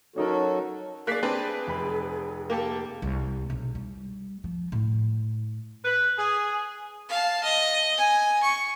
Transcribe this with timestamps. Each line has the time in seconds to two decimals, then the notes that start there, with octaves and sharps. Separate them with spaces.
0.16 F#3 C#4 D#4 F#4 A4 A#4
1.07 A#3 G#4 D5 F#6 B6 C7
1.23 C4 D4 B4
1.67 F1 B5
2.50 A#3 G4 A4
3.02 C2
3.50 B1
3.75 G3
4.44 F3
4.72 A2
5.84 B4
6.18 G#4
7.09 F5 A5
7.44 D#5
7.98 G#5
8.43 C#6